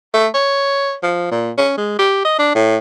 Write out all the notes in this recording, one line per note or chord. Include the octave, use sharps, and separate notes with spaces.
A3
C#5
F3
A#2
C#4
G#3
G4
D#5
D4
A2